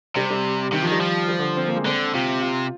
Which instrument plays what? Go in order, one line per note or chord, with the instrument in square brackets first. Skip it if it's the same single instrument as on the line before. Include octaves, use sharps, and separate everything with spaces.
[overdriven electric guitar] C3 [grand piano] G3
[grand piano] G3
[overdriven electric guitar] C3 [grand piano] D#3
[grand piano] F3
[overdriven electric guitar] D#3 [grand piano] G3
[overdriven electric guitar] F3
[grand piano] G3
D3
C4
A#3
G#3
[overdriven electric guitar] D3 [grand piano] C4
[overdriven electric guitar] C3 [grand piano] F4
[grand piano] F4